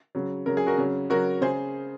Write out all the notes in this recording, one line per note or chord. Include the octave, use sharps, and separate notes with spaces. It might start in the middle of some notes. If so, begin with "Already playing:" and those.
C#3 F#3
C#3 F#3 A#4
G#4
F#4 A#4
C#3 F#3
C#3 F#3 F#4 A#4
C#3 G#4 C5